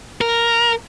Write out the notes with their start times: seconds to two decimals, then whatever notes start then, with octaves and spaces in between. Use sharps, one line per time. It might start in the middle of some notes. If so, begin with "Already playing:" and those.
0.21 A#4